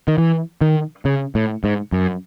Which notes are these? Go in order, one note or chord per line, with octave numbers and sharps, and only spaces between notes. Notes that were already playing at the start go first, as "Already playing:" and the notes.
D#3
E3
D#3
C#3
A2
G#2
F#2